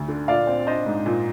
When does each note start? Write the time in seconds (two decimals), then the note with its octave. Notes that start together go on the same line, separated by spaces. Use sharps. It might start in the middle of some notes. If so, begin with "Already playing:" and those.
Already playing: D2
0.08 D3
0.28 A#2 D5 F5
0.47 C4
0.67 D4 C5 D#5
0.86 G#2
1.06 A#2